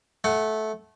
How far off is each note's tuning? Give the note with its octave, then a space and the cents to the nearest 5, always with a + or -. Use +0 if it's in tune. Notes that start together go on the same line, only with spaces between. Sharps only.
A3 -15 F#5 +0